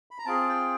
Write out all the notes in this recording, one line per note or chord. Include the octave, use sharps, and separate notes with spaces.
B5
A#5
C4 F4 G#4 A5
G5